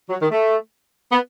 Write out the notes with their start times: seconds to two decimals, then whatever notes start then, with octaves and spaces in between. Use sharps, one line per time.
0.09 F#3
0.21 D#3
0.31 A3
1.12 B3